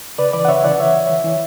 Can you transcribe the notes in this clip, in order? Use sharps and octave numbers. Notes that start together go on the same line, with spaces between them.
C#3 B4 D5
E3 B4 D5
F#5
C#3 C#5 E5
E3 D5 F#5
E3 C#5 E5
E3
E3
E3